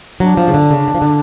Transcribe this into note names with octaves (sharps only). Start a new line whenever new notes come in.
F#3 D4
F3
C#3
D3
C#3
D3
F3
D3